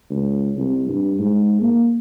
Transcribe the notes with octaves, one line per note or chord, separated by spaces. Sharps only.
C#2
C2
G2
G#2
A#3